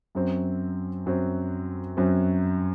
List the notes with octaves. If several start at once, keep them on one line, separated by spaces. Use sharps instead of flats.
F#2 F#3 C4
F#2 F#3 C4
F#2 F#3 C4